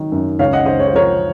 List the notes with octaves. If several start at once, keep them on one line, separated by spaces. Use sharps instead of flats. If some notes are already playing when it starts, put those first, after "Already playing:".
Already playing: D#3 F#3
F#2
C#2 C#5 F5
D#5 F#5
C#2 C5 D#5
C#5
C5
F3 A#4 C#5